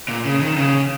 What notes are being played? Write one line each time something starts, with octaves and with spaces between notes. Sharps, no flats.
A#2
C#3
D#3
C#3